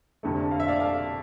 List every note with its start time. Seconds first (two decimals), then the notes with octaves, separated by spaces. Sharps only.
0.23 F1 F2 D3 A3
0.51 F5
0.60 E5
0.68 D5 F5
0.80 F5 A5